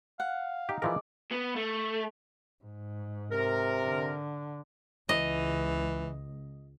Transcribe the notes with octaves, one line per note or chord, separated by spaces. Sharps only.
F5 F#5
D#4 G4
E3 F3 G#3 A#4 D5 D#5
B3
A3
G#2
C3 A#4
D3
C#2 E3 D#5